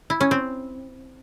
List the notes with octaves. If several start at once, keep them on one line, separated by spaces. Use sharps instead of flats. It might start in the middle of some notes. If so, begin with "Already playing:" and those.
E4
C#4
C4